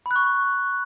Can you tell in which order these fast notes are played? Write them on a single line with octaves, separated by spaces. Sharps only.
B5 F#6 C#6